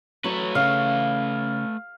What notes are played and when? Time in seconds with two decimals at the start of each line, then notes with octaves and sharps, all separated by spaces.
0.24 F#3 A3 B4 C#5
0.55 C#3 F5